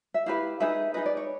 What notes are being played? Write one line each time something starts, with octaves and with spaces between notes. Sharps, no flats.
E5
E4 G4 B4 F5
D#4 G#4 B4 E5
D#4 G#4 B4 D#5
D5
C#5